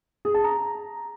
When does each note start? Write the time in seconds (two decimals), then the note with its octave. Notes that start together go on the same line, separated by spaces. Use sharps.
0.25 G#4
0.34 A5
0.44 A#5